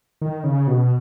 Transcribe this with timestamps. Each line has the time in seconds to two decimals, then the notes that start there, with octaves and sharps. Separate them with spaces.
0.21 D#3
0.44 C#3
0.67 B2